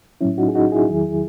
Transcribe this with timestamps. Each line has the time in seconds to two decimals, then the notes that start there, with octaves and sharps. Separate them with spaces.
0.21 A2 F#3 C#4 E4
0.38 D#4 F#4
0.48 G#4
0.55 D#4 F#4
0.72 E4 G#4
0.89 E2 D#3 F#3